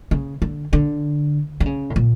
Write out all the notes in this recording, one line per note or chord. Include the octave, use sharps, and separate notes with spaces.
C#3
D3
D3
D3
C#3
A2
A#2